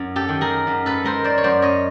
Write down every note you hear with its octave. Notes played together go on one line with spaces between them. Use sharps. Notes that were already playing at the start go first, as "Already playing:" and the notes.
Already playing: F#2
G4 A4
D#3
G#4 A#4
F#2
A4 B4
G#3 A#4 C5
C5 D5
C#5
F#2 C5 D5
C#5 D#5